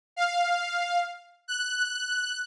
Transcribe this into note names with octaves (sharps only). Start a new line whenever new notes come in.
F5
F#6